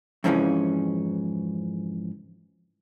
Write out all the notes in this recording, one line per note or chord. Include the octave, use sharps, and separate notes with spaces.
F2 G#2 C#3 E3 F3 C#4